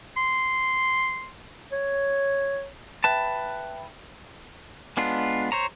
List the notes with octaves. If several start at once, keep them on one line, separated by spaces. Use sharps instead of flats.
C6
C#5
B4 E5 G5 A5 B5
G#3 B3 D4 F4
C5 C#5 A#5